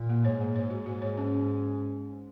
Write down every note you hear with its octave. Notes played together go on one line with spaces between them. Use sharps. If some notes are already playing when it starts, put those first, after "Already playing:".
Already playing: A#2
A#3
G#2 C#5
A#3
G#2 C#5
F#4
G#2 F#4
C#5
C#4